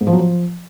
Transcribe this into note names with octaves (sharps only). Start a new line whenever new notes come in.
G#2
F3
F#3
F3